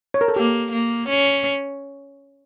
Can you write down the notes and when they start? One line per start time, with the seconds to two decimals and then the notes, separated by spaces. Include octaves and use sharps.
0.14 C#5
0.21 A#4
0.28 A4
0.36 A#3 G4
0.72 A#3
1.09 C#4